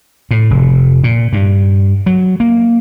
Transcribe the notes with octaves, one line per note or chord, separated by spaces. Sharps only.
A2
F1
A#2
G2
F#3
A#3